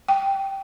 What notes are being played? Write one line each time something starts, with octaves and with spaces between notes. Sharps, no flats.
G5